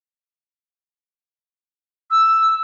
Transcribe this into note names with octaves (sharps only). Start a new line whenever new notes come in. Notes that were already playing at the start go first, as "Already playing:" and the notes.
E6